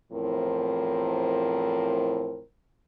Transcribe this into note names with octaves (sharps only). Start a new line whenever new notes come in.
E2 A2 F3 C4 A#4